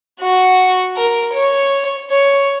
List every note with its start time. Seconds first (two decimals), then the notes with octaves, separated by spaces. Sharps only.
0.21 F#4
0.97 A#4
1.34 C#5
2.10 C#5